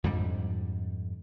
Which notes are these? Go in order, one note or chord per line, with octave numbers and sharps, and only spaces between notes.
F2 G#2 D3 G3